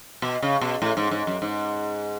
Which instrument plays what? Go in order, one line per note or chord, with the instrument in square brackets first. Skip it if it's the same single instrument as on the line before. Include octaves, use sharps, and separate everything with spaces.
[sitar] B2
C#3
B2
A2
G#2
G#2
F#2
G#2